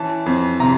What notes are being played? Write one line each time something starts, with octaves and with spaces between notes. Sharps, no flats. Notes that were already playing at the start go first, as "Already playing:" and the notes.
Already playing: E3 C#4 A5
F2
C3 A#5